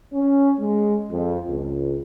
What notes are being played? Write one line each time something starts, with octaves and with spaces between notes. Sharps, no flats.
C#4
G#3
F2
C#2